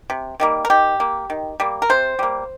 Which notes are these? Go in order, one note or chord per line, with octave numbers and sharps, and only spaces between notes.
C3
D#3 G3 A#3
A#4
D#3 G4
A#3
D#3
G3 A#3
A#4
C3 C5
G3 A#3